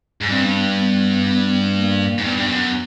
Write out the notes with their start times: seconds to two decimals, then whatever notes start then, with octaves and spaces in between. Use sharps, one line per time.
0.21 G#2
0.29 G2 C4
0.42 B3
0.54 B3
0.78 B3
1.75 A#3
2.18 G#2
2.24 G2 B3
2.38 G2
2.48 F#2